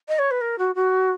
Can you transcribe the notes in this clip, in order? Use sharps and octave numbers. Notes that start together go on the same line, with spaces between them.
D#5
C#5
B4
A#4
F#4
F#4